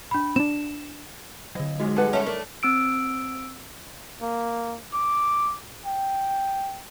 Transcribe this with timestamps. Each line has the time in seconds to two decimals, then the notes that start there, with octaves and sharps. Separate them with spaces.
0.11 D4 B5
0.36 C4 D4 E7
1.55 D3 F#3 D#5
1.80 G3 G#3 D#4 F#4
1.96 G4 A4 B4 F#5
2.13 C#4 E4 A4 C#5 A5
2.26 A3 D4 A#4
2.63 C4 E6 D7
4.22 A#3
4.94 D6
5.86 G5